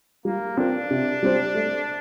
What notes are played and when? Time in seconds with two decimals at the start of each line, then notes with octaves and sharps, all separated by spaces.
0.25 G3 A#3
0.57 C4 D4 F4 A#4
0.91 C3
1.23 G3 C4 G4 C5
1.55 A3